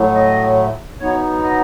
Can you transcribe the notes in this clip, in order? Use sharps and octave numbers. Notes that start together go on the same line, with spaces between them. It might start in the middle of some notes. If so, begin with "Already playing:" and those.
Already playing: A2 F#3 A3
D#5
F#3 B3 D#4 C#5
D#5